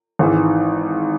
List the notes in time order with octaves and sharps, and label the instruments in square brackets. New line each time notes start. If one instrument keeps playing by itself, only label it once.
[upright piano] G#1 G#2 E3